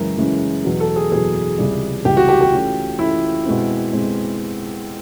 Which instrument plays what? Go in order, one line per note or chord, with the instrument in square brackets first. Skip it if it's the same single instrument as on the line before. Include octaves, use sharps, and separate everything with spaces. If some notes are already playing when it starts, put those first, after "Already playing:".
Already playing: [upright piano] F#2 C#3 E3 G#3 [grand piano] A#4
[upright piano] F#2 C#3 E3 G#3
E2 B2 F#3
[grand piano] A4
G#4
[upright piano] E2 B2 F#3 [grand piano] G#4
[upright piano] C#2 C3 E3 G3
[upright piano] C#2 C3 E3 G3 [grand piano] G4
[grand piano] F#4
G4
G4
[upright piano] E3 A3 C#4 F4
[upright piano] E3 A3 C#4 F4 [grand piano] E4
[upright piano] B2 G#3 C4
B2 G#3 C4